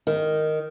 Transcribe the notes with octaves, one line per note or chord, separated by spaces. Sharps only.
D#3